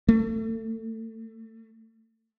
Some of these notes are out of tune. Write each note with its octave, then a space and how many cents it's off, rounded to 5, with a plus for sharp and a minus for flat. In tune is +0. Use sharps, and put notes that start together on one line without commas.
A3 +30